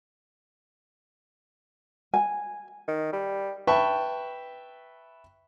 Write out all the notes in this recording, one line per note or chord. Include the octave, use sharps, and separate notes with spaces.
G#5
D#3
G3
B4 E5 G5 A5 B5 C#6